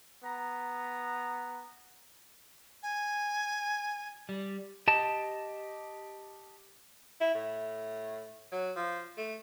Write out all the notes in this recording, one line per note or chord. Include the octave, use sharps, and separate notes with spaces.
B3 A#5
G#5
G3
G4 D#5 A5
E4
A2
F#3
F3
A3